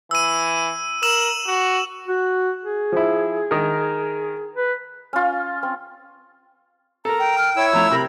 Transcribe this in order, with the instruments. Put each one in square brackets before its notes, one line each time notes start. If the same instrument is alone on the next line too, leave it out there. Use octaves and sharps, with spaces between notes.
[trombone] E3 [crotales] E6 D#7
[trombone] A#4 [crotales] E6 E7 F#7
[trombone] F#4
[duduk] F#4
G#4
[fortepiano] F3 E4
D#3 A#4
[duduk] B4
[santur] C#4 F4
C4
[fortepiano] A4 A#4 [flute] A#5
[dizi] G5
[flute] F6
[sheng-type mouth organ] E4 E6 [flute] C#5
[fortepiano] F2 A3 [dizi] A#5
[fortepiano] C3 [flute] A#4 [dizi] B5